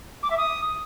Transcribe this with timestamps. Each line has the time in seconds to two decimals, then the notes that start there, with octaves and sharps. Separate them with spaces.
0.23 D6
0.30 E5
0.37 D#6